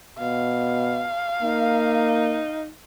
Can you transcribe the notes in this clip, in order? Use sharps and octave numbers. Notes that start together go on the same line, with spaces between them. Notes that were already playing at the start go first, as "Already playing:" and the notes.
B2 F5
A#3 D#4